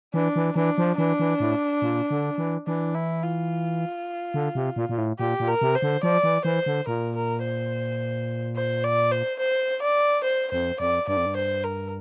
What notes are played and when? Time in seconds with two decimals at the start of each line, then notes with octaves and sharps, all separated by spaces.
0.14 E3 D4
0.36 E3
0.56 E3 D4
0.78 F3
0.98 E3 D4
1.19 E3
1.40 A2
1.82 A#2
2.10 D3
2.38 E3
2.67 E3 D4
2.94 E4
3.22 F4
4.34 D3
4.55 C3
4.76 A#2
4.89 A#2
4.98 A2
5.19 A#2 G4
5.40 A#2
5.47 A#4
5.61 C3
5.75 C5
5.82 D3
6.03 F3 D5
6.23 E3
6.45 E3 C5
6.66 D3
6.87 A#2 A#4
7.15 A#4
7.43 C5
8.56 C5
8.84 D5
9.11 C5
9.39 C5
9.82 D5
10.23 C5
10.51 F2 C5
10.80 F2 D5
11.08 G2 D5
11.17 F2
11.26 G2
11.36 C5
11.64 A#4